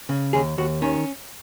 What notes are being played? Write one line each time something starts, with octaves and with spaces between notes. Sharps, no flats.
C#3
D#2 G#4
D#2 F#4
D#3 C#4